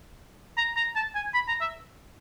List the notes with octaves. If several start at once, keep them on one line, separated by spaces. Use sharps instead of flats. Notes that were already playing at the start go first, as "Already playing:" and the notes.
A#5
A#5
A5
G#5
B5
A#5
E5